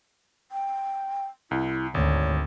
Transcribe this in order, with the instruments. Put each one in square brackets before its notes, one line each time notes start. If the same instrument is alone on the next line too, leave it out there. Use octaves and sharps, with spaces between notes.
[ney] G5
[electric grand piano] C2 [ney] E4
[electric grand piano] G#1 [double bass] D2 [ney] C#5